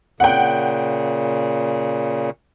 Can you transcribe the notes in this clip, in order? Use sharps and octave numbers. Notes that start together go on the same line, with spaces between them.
A#2 C#3 F#5 G5